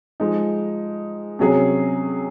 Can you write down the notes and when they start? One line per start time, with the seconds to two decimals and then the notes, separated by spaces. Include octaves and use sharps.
0.20 F3 G#3 D#4
1.39 C3 F#3 C#4 G#4 C#5